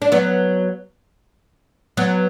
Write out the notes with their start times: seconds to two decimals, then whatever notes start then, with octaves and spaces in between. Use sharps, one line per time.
0.02 D4
0.12 F#3 B3
1.97 F#3 B3